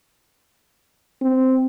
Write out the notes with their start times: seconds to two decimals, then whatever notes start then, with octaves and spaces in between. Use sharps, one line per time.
1.22 C4